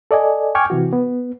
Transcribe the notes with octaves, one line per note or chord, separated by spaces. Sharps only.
A4 D5 D#5 G#5
G5 G#5 C#6 D6 F6 G#6
C3 E3 F#4
B3